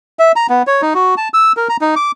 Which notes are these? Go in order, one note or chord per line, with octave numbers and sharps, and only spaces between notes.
E5
A#5
B3
C#5
D#4
F#4
A5
E6
A#4
A#5
D#4
D6